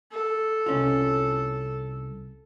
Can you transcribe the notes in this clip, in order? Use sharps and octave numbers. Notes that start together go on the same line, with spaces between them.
A4
C2 C#4 F4